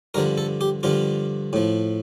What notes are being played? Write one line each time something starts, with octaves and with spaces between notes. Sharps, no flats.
G2 D3 F3 A#4
A4
G4
G2 D3 F3 F4
A2 F3